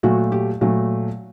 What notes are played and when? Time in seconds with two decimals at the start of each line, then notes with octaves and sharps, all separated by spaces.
0.03 A#2 F#3 A3 F#4
0.32 G4
0.61 A#2 F#3 A3